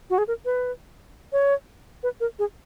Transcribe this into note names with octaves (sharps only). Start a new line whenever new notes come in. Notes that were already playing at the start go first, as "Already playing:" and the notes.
F#4
G#4
A#4
B4
C#5
B4
A#4
G#4